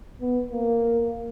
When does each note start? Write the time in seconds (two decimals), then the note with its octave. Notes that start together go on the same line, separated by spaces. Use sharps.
0.21 B3
0.51 A#3